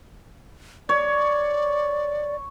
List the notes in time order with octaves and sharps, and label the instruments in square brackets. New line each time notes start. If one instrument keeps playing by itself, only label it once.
[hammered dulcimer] C#5 [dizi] D5